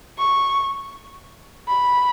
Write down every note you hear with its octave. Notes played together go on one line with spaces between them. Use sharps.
C#6
B5